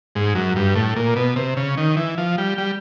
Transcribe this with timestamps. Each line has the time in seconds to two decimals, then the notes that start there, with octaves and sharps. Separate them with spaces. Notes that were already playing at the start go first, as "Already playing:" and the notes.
0.15 G#2
0.35 F#2
0.56 G2
0.76 A2
0.96 A#2
1.16 B2
1.36 C3
1.57 C#3
1.77 D#3
1.97 E3
2.18 F3
2.38 G3
2.58 G3